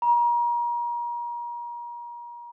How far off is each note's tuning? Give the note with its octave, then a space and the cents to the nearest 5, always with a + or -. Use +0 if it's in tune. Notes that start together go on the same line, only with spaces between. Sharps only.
A#5 +35